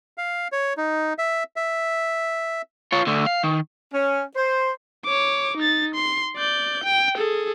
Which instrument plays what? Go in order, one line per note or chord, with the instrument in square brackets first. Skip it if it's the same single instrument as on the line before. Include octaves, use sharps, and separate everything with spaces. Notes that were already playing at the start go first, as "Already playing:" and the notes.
[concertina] F5
C#5
D#4
E5
E5
[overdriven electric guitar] F4 C#5
D2 D3
F5
D#3
[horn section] C#4
C5
[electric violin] C#5 D6
D#4 A6
C6
D5 G6
G5
G#4 A4